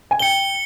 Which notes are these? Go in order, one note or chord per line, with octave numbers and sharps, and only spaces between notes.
G#5
G5 C#7 G7